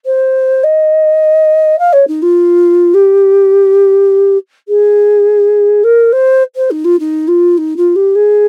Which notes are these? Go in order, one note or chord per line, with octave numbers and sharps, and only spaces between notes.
C5
D#5
F5
C#5
D#4
F4
G4
G#4
A#4
C5
C5
D#4
F4
D#4
F4
D#4
F4
G4
G#4